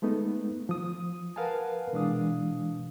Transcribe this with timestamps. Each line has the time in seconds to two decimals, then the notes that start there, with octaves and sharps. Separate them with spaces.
0.02 G#3 A3 B3 D#4
0.69 F3 D#6
1.36 A#4 B4 F5 F#5 G#5 A5
1.93 B2 E3 G#3 D4 F5 D#6